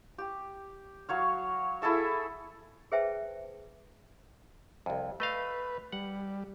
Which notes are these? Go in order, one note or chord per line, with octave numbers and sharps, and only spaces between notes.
G4
F#3 C#5 F5
E4 G#4 A4 E5
G#4 B4 C5 E5 G5 A5
C2 F2
A3 B4 D#5 F5
G3 F#5